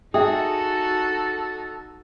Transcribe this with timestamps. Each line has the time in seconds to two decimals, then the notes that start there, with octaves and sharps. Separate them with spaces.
0.14 D#4 F#4 G#4 A4 E5 G5 D#6